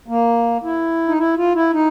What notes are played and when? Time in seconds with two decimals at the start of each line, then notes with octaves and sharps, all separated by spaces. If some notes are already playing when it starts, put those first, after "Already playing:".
0.08 A#3
0.63 E4
1.08 D#4
1.18 E4
1.37 F4
1.55 E4
1.73 D#4